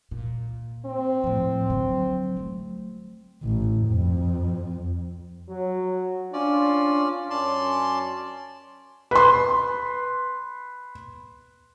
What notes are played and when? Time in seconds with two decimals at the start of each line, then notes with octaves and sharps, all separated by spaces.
0.11 A#2
0.86 C4
1.24 A2 F3
1.70 D3 F#3
2.37 F#3 A3
3.43 A1
3.87 F2
5.49 F#3
6.33 C#4 D4 F4 D5
7.30 F#2 C#4 D5 A5 C6
9.11 B4 C6